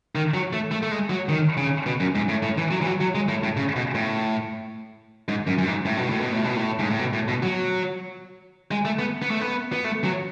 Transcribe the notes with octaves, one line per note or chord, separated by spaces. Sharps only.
D#3
F#3
A3
A3
A3
G#3
F#3
D#3
C#3
B2
F#2
G#2
A2
A2
E3
F#3
E3
F#3
F#3
G#3
A2
A2
C#3
B2
A2
G#2
F#2
F#2
G#2
A2
B2
A2
B2
A2
B2
A2
G#2
A2
B2
A2
B2
F#3
G#3
A3
B3
B3
A3
B3
B3
A3
F#3